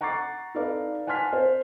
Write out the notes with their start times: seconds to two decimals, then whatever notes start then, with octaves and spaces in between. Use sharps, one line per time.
0.01 F#5 A#5 C#6 D6 A6 C7
0.54 D#4 A4 B4 D5 D#5 F5
1.07 F#5 G#5 A5 C6 F6 B6
1.33 C5